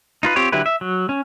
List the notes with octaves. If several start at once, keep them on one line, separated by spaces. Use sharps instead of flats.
D#4 F4 B4
C4 F4 G4 C#5
D3 F#3 E4 G4 B4
E5
F#3
C#4